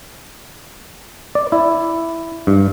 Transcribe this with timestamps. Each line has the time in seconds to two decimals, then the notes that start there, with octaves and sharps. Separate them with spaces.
1.35 D5
1.52 E4
2.47 G2